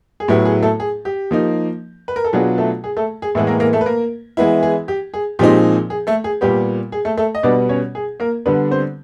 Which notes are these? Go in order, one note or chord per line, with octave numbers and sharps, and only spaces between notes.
G#4
A2 F#3 B3 E4 G4
G#4
A3 A4
G#4
G4
F3 A#3 D#4
B4
A#4
A4
B2 F#3 B3 D4 F4 G#4
A3 A4
G#4
A3 A4
G#4
A2 E3 G#3 A3 B3 A4
A#3 A#4
A#3 A#4
A3 A4
B4
A#3 A#4
E3 G#3 B3 E4
G#4
G4
G#4
A#2 F3 G#3 C4 D#4 G4
G#4
A3 A4
G#4
A#2 G3 B3 G4
G#4
A3 A4
A3 A4
D#5
B2 G3 B3 D4 D5
C#4 C#5
G#4
A#3 A#4
D3 G3 B3 D4 B4
C4 C5